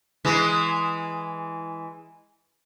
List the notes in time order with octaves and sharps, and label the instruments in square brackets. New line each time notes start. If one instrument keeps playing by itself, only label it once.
[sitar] E3 G#3